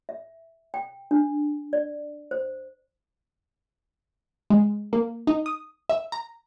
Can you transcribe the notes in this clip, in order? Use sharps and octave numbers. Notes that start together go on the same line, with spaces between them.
E5
G5
D4
D5
C5
G#3
A#3
D#4
D#6
E5
A#5